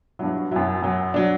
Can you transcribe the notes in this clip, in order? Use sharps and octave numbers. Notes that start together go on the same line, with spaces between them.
G2 F#3 E4
F#4
F#2 F#3 E4
F#2 F#3
F#3 D4